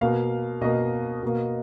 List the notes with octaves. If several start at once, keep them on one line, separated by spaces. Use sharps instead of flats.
B2 A#3 F5
B2 A#3 D#5
B2 A#3